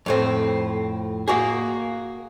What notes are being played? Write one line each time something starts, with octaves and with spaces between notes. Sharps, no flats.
F2 A2 C4
A#3 F#4 G#4